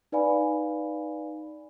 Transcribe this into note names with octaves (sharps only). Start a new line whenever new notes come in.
D#4 B4 D5 F5 G#5 B5